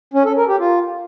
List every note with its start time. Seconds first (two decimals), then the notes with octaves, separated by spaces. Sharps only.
0.14 C#4
0.25 A4
0.37 A#4
0.48 G4
0.59 F4